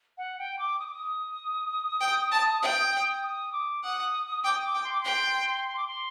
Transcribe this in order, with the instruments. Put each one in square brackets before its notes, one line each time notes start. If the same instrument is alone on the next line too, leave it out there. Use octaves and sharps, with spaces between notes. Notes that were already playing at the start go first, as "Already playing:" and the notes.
[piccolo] F#5
G5
D6
D#6
D6
D#6
[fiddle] G5
A5
G5
[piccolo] D#6
D6
[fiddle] F#5 [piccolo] D#6
[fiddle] G5 [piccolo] D6
[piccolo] D#6
D6
[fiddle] G5
[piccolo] C6
D6
[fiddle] G5 [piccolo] C6
[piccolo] C6
D6
C6